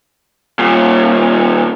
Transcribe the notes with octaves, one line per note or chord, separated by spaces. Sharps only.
D#2 A#2